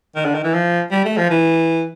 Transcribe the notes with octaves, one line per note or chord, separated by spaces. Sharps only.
D#3
D3
D#3
E3
F3
G3
A3
F3
E3